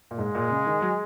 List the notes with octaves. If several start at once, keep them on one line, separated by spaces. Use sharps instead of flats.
A#2
G#2 G#3
A#2
C#3
D#3
F#3